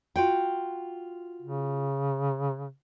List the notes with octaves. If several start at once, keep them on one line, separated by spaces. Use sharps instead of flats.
F4 F#4 G5
C#3